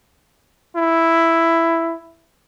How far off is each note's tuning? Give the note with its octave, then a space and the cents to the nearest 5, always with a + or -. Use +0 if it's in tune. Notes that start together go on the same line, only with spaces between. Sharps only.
E4 +5